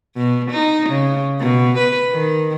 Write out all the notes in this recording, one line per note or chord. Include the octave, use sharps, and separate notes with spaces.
B2
D#4
C#3
B2
B4
D#3